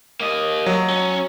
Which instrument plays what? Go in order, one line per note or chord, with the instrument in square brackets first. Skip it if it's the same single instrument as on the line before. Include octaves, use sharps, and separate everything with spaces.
[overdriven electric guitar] A#3 D#5
[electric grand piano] F#3
[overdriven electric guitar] C#4